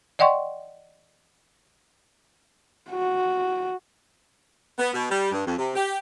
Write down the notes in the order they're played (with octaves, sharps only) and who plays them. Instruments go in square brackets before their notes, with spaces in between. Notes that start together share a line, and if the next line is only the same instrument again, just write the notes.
[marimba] D5 D#5 F#5 G5 C6 C#6
[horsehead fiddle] F#4
[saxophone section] B3
B2
G3
G2
F2
C3
G4